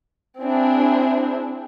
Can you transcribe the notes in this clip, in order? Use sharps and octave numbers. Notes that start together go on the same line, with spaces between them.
C4 D4 E4 G#4